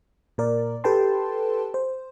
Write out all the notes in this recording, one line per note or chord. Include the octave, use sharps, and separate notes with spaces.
A#2 A#4 D5
G4 A4 B4 G5 A5 C6
C5